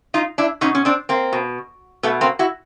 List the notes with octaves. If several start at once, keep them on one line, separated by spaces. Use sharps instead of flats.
D#4 F4
D4 E4
B2 C#4 D#4
C#4
C4 D4
A#3 C4
B2
B2 A3 B3
A#3 C4
E4 F#4